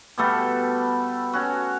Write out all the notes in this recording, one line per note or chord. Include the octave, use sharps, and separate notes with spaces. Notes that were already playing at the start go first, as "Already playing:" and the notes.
B2 G3 A3 A4
C#4 F#4